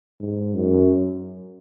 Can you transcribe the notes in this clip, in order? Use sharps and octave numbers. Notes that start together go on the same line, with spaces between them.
G#2
F#2